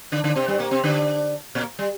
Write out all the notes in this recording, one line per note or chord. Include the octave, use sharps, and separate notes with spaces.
D3 D4
D3 D4
C3 C4
G2 G3
A#2 A#3
C3 C4
D3 D4
A#2 A#3
G3